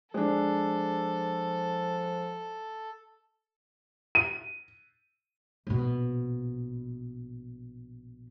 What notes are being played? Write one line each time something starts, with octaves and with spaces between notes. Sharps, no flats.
F3 G#3 D4 A4
D#7
A#1 B2